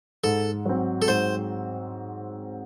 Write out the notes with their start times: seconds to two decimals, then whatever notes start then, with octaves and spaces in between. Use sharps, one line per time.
0.24 G#2 A4
0.66 F#3 C4
1.02 A4
1.08 G#2 C5